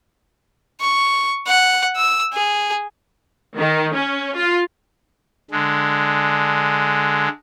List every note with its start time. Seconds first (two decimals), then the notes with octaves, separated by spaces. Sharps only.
0.81 C#6
1.47 F#5
1.96 E6
2.34 G#4
3.57 D#3
3.95 C#4
4.35 F4
5.51 D3 G#3